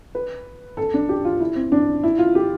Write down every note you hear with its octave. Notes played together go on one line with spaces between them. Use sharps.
B4
A4
D4
G4
F4
E4
C4
D4
E4
F4
G4